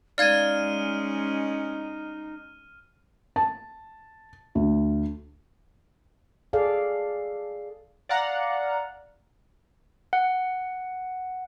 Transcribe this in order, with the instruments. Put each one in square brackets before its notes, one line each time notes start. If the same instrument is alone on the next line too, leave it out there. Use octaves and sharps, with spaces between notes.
[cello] G#3 C#4 [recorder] D#4 [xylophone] D5 F5 G#6 [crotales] F6 D#7
[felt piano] A5
D2
[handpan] G#4 A4 D5 F5
[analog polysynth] D5 F5 F#5 A#5
[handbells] F#5